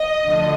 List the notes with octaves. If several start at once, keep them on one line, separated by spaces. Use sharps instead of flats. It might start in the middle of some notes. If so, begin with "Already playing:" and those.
Already playing: D#5
D2 D3 F3